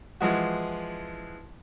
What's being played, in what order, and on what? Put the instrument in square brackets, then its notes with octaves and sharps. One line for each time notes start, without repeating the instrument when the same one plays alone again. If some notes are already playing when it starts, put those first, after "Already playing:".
[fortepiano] E3 F3 G#3 F#4